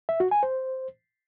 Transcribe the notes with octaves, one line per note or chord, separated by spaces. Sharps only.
E5
F#4
G#5
C5